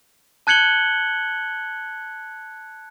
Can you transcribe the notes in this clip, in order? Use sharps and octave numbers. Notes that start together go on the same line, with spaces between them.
A5 F#6 G#6 C#7 F#7 G7